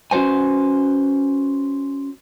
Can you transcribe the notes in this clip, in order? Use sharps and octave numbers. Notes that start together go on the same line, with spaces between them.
C#4 F#4 B4 C5 G#5